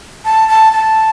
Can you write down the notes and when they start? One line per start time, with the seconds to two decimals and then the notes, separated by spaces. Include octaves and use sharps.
0.25 A5
0.49 A5
0.73 A5